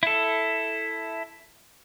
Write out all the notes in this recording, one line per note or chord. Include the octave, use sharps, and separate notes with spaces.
E4 A4